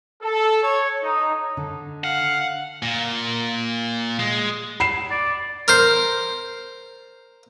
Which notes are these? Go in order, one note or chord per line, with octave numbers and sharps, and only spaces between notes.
A4
C#5
D#4
D3
F5 F#5
A#2
G#3
B5 C7 E7
D5
A#4 C5